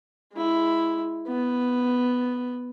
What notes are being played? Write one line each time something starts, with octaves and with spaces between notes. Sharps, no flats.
G#3 E4
B3